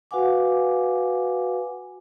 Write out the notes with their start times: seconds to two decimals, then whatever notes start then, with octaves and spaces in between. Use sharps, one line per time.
0.11 F#4 B4 F5 F#5 G#5 D6